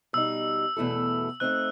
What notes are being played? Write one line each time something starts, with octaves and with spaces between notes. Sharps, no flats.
B2 G3 D#4 E6
E2 B2 A3 E4 A4
A3 C4 D#4 F#6